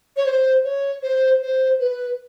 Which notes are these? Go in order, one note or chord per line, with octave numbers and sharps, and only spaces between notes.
C#5
C5
C#5
C5
C5
B4